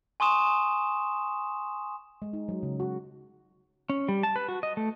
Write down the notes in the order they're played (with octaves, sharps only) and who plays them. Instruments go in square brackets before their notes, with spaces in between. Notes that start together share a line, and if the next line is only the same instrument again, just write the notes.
[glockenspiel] G#5 C6 C#6 D#6 E7
[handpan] G#3
D#4
F#3
C#3
F#4
[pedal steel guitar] C#4
G3
A5
B4
F#4
D#5
A3